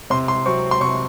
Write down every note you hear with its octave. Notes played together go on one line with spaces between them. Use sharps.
C3 C6
C6
F#3 C4 C#6
C6
C3 C#6